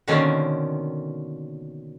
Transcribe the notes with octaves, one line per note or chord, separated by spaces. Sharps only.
B2 D3 D#3 A#3 C4 C#4